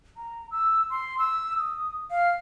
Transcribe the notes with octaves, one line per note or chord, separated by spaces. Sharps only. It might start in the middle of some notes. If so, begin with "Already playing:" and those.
A#5
E6
C6
E6
D#6
F5